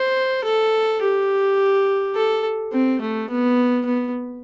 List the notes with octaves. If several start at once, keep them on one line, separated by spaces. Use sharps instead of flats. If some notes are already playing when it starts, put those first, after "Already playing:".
Already playing: C5
A4
G4
A4
C4
A3
B3
B3